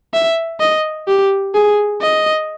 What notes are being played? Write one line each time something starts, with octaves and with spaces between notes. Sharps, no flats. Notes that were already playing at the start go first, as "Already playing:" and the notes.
E5
D#5
G4
G#4
D#5